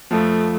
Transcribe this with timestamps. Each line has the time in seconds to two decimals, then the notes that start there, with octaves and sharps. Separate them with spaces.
0.11 F2 F3 A3